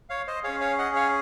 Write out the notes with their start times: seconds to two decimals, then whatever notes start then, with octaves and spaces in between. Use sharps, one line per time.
0.09 C#5 F5
0.27 C5 D#5
0.44 C#4 G#4 C#5 F5
0.61 C#5 F5
0.78 D#5 F#5
0.95 C#5 F5